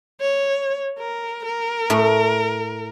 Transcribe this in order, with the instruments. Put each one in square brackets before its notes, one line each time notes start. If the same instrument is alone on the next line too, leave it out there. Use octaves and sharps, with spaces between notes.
[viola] C#5
A#4
A#4
[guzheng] A2 A3